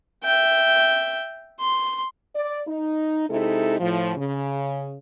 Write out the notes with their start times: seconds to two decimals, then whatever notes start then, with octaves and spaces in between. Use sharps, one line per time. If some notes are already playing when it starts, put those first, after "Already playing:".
0.24 E5 G5
1.60 C6
2.34 D5
2.67 D#4
3.29 C3 G#3 D#4 E4 A4
3.79 A2 F3
4.16 C#3